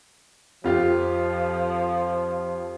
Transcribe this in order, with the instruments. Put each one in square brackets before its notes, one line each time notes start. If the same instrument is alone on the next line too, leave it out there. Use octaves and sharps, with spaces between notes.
[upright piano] F2 F4 G4 [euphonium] F3